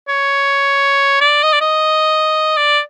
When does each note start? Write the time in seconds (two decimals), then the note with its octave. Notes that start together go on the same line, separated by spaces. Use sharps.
0.08 C#5
1.21 D5
1.43 D#5
1.53 D5
1.61 D#5
2.57 D5